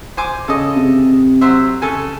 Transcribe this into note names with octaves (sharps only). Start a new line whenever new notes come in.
C5 G#5 D6
C#3 A4 D#5
C3
F#3 C5 E5
C#3 A4 G#5